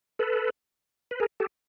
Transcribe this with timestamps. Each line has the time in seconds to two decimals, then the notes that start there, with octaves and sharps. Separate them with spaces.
0.19 A4 B4
1.11 B4
1.20 G#4 A#4
1.40 G4 A4